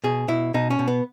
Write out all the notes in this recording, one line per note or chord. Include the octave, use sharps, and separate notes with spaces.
B2 G#4
B2 E4
B2 D#4
C#4
B2
B3